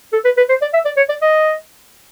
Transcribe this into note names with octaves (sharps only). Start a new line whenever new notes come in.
A4
B4
B4
C5
D5
E5
D5
C#5
D5
D#5